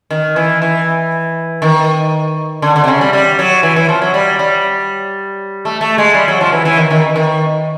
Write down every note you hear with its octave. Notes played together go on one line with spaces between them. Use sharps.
D#3
E3
E3
D#3
D3
D3
C3
C#3
G3
G3
F#3
E3
E3
F3
F#3
G3
G3
A3
A3
G#3
G3
F#3
F3
E3
E3
D#3
D#3
D#3